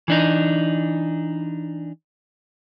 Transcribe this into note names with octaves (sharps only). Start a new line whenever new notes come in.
E3 D4 D#4